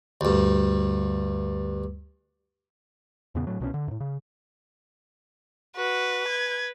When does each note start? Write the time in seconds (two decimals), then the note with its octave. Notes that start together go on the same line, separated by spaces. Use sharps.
0.21 D2 G2
3.35 E2 A#2 C#3 B3
3.47 A2 F#3
3.60 C2 B2 D#3 C#4
3.74 D3
3.88 F#2 A2
4.00 C#3
5.76 F#4 B4
6.28 G#6